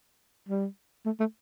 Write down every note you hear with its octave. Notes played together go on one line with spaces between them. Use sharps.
G3
A3
A3